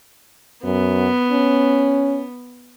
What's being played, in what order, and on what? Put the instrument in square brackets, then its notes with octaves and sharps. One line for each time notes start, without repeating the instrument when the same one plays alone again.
[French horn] F#2 [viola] B3
[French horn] C#4